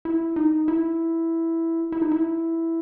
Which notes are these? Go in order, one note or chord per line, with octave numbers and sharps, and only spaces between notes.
E4
D#4
E4
E4
D#4
E4